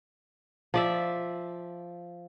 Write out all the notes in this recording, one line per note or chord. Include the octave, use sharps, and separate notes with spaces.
F3 D5 E5